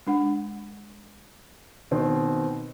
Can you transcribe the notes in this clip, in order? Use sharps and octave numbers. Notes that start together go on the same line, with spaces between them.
G#3 D4 F#5
B2 D#3 C4